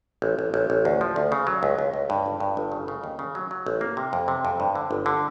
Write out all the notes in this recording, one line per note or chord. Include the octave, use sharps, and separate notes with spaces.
A1
A1
A1
A1
D2
F3
D2
C#3
F#3
C#2
C#2
C#2
G2
G1
G2
G1
C#3
C#3
D#2
C#3
F#3
F#3
A1
A#3
C3
F2
C3
F2
G2
D3
G1
D3